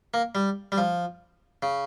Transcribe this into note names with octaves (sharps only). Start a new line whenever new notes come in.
A#3
G3
G3
F3
C#3